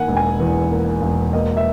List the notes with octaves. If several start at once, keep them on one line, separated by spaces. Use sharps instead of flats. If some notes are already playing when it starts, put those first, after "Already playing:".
Already playing: D#3 A#3 F#5 G#5
E1
G#5
E2
A#3
E1
A#3 D#5
E5